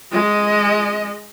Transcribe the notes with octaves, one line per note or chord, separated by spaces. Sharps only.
G#3 D#5